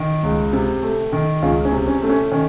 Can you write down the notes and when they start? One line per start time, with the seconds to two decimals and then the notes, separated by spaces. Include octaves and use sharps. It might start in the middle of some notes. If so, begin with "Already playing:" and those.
Already playing: D#3
0.23 C#2
0.53 C3
0.83 A3
1.12 D#3
1.42 C#2 C#4 F4
1.65 C#4
1.72 C3
1.87 C#4
2.02 A3 C4
2.09 C#4
2.31 D#3 C#4